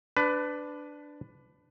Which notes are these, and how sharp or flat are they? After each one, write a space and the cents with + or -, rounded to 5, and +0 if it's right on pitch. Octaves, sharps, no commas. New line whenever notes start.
D4 +0 B4 +20